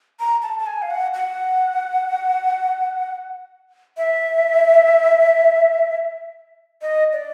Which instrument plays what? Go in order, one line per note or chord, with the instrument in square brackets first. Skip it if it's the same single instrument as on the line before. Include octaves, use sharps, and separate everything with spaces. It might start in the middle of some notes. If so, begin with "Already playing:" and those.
[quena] A#5
A5
A5
G#5
F5
F#5
F#5
E5
D#5
D5